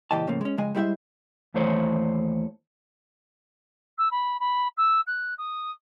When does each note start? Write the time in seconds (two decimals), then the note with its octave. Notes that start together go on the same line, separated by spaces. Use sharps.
0.11 C#2 A#2 E3 G4 D#5 A5
0.27 A2 C#3 F3 A3 A#3
0.41 G#3 C#4
0.58 F2 C#3 G#3 D#5 G#5
0.75 G3 G#3 E4 F4 C5 E5
1.54 D#2 E3 A3 C5 C#5
3.98 E6
4.11 B5
4.40 B5
4.77 E6
5.06 F#6
5.38 D#6